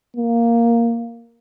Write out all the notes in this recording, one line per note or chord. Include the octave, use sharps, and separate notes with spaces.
A#3